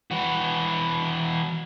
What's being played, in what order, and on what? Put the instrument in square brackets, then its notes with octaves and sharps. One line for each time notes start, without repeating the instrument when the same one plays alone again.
[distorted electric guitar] E3 F#4